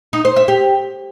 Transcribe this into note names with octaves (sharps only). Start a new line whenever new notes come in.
D#4
C5
E5
G4